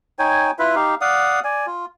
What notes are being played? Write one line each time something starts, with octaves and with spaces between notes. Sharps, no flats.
D#4 C#5 G5 G#5
E4 F4 B4 E5
D#4 G4 F5
D5 F5 F#5 D#6
D5 G#5
F4